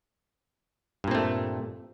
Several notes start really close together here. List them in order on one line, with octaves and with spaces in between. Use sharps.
G2 A#2 C4 A3